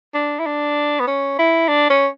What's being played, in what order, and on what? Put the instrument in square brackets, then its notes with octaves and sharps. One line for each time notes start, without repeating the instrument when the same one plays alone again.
[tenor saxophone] D4
E4
D4
B3
C#4
E4
D4
C#4